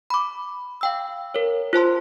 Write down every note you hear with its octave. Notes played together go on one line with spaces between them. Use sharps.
B5 D6
F5 G5 E6
A#4 C#5
F4 C5 A5 C6